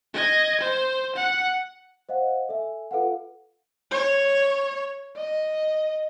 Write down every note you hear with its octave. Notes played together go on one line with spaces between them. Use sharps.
D#5 G#6
C5
F#5
C5 D#5 F5 F#5
A4 E5 G#5
F4 A4 B4 F5 F#5
C#5
D#5